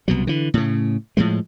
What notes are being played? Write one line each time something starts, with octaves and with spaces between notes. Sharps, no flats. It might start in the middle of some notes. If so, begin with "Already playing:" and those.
C2 B2 F#3
D3 E3
A2 C#3
A2 F3 G#3